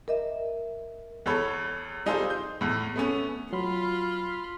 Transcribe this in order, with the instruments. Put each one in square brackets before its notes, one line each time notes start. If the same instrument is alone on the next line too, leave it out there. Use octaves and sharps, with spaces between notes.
[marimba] A#4 D#5 E5
[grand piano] E2 A4 C#5 B5
G3 D#4 F4 G#4 A4 C5
G6
E2 A2
A3 B3 C#4
[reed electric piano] F#3 [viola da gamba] F4 [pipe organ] B5 C6 F6